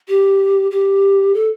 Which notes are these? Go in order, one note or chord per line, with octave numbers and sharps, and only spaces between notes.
G4
G4
A4